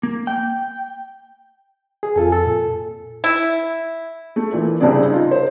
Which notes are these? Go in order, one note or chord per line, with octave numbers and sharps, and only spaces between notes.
A#3
G5
G#4
F2 F4 A4 G#5
A4
A#2
E4
A3
A#2 E3
C2 G2 C#3 C4 G#4 D5
D#4 F4
C5